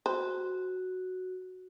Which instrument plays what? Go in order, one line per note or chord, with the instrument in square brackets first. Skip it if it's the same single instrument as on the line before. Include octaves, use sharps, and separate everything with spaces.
[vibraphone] F#4 [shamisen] C5